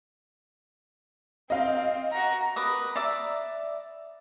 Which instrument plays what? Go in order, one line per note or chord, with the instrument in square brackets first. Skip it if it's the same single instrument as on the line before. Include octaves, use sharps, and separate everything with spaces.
[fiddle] C4 [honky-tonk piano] D#5 F5
[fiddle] F#4 A#5
[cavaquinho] A#4 B4 D6 D#6
D5 E5 A#5 D6